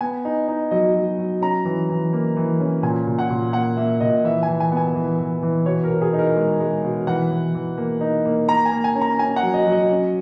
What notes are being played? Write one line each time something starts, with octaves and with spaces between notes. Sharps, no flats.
B3 G#5
D#4
D#4
F#3 D#5
F#3
F#3
C#4 A#5
E3
E3
A#3
E3
C#4
A#2 G#5
A#2
F#5
A#2
A#3 F#5
A#3 E5
A#2 D#5
E3 E5
G#5
E3
G#5
B3
G#5
E3
E3
E3
B2 C#5
A#4
B2
G#4
D#4
A#4
G#3
G#3
B2
E3 F#5
E3
E3
A#3
D#4
A#3
A#3 A#5
G#5
A#3
G#5
C#4
A#5
C#4 G#5
F#5
F#3
D#5
F#3
D#5
C#4